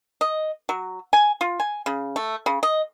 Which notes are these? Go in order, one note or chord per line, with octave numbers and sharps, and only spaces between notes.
D#5
F#3
G#5
F4
G#5
C#3
A3
C#3
D#5